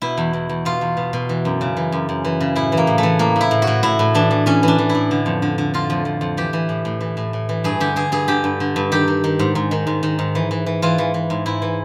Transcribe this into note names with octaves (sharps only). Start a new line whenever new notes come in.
B2 E4
E2
E2
E2
B2 F4
E2
B2
B2
E3
F#2
C#3
E3
F#2
F#2
E3
C#3
A2 E4
E3
A#3
A2
A3
E3
A2 A#3
A2 E4
A2
F#4
A2
A2 E4
A2
E3 D4
E3
E3 C#4
E3 D4
E3
E4
A2
D3
F2
D3
D3
D3 F4
F2
F2
F2
E3 G4
E3
A2
A2
E3
A2
A2
E3
G2 G#4
D3 G4
D3 G#4
G2 G#4
D3 G4
G2
D3
G2
D#3 G4
D#3
D#3
G#2
G#2
D#3
G#2
D#3
G#2
E3
E3
E3
E3 F4
E3
E3
G#2
G#2 E4
E3